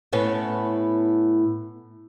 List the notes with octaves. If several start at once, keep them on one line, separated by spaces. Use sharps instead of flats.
A2 B3 C#4